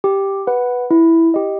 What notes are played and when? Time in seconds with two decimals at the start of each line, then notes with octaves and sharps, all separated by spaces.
0.04 G4
0.47 B4 F#5
0.91 E4
1.34 G4 D#5